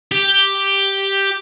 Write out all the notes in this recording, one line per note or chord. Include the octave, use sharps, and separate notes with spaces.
G4